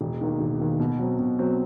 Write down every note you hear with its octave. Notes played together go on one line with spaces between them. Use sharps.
E1
D#2 D#3
E1
D#2 D#3
B2
F#3 C4
B2
F#3 C4